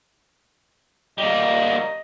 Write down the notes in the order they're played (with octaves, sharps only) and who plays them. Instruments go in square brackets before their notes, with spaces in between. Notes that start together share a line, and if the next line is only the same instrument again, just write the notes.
[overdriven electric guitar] G3 A#3 [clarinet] D#5